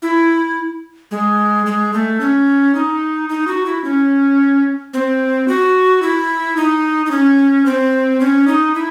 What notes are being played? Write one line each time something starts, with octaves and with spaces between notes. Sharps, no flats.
E4
G#3
G#3
A3
C#4
D#4
D#4
F#4
E4
C#4
C4
F#4
E4
D#4
D#4
C#4
C4
C#4
D#4
E4